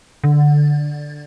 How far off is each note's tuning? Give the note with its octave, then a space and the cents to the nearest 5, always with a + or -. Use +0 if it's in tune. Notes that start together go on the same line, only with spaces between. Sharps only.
D3 +5